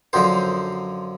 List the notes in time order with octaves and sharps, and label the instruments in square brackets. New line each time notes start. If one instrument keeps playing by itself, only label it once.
[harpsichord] F#2 D3 F3 C5